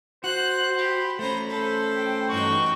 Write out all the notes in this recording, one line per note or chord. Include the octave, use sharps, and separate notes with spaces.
F#4 C5 F#6
G4 B5
A3 C#4 C5 A#5
A4 C5
G5
G2 E3 D#4 F#4 G5 C#6